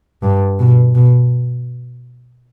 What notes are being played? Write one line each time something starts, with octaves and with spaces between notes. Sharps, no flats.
G2
B2
B2